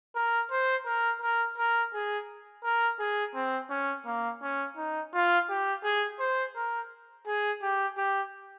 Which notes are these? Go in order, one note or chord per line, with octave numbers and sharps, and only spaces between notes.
A#4
C5
A#4
A#4
A#4
G#4
A#4
G#4
C4
C#4
A#3
C#4
D#4
F4
G4
G#4
C5
A#4
G#4
G4
G4